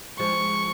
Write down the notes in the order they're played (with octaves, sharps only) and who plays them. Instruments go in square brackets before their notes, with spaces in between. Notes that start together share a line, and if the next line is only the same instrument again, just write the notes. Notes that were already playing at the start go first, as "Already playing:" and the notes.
[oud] F3 G#3 [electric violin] C#6